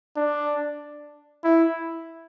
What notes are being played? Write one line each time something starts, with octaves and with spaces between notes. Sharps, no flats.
D4
E4